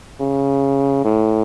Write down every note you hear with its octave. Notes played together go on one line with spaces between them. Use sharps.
C#3
A2